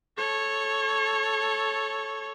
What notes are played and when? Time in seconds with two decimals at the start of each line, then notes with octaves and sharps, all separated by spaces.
0.18 A4 C#5